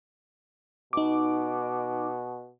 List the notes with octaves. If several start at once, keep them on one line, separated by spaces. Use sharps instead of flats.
B2 D#4 D6